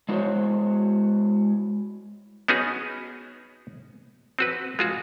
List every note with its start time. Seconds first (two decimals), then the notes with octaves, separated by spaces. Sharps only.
0.09 G#3 E4 F#4 C5 C#5
2.48 B3 C#4 D#4 F#4 G#4
4.39 C4 F#4 B4
4.79 G#3 F4 F#4